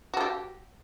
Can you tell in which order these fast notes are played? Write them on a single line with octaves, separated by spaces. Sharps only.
F#4 A4 G4